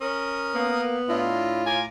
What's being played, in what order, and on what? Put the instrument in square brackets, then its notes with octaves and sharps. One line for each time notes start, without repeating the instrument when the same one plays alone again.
[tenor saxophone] C#4 [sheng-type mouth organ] A#4 D#6
[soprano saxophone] A#3 [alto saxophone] B3
[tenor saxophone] A2 [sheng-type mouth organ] D4 E4 D#5 [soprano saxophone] F4
[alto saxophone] G#5 [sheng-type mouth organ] A#5 D6